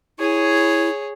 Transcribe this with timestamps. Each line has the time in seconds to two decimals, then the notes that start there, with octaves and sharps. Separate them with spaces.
0.19 E4 G#4 C#5